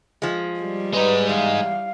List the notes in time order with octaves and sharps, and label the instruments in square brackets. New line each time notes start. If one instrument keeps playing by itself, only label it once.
[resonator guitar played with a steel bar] F3 G#3
[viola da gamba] G3
[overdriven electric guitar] G#3 D#4 [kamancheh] B4
[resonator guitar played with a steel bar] E2 [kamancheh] F5